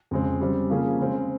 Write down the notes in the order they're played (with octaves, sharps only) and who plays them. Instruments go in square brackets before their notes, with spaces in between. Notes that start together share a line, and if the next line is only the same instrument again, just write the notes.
[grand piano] F2 C#3 G#3 C4
C#3 G3 C4
C#3 F3 A#3 C#4 G#4
C#3 G#3 C4